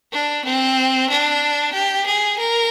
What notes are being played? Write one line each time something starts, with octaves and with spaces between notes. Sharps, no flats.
D4
C4
D4
G4
G#4
A#4